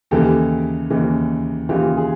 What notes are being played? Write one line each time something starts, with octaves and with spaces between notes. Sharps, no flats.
D#2 C#3 E3 G4 A4
D#2 C#3 E3
D#2 C#3 E3 F4 G4
G#4